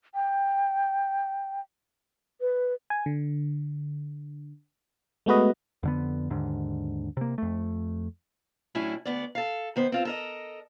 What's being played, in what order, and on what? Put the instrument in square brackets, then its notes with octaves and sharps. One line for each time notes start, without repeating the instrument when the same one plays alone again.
[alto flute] G5
B4
[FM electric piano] G#5
D3
G#3 A3 B3 F#4 B4 D#5
[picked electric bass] F2 D3 B3
D#2 G#2 D3
C3 A#3
F2 A3
[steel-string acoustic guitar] A2 F#3 C#4 D4 E4 G#5
D2 B3 D5
A4 F5
D#3 B3 C5
C4 F4 A4
A4 A#4 D#5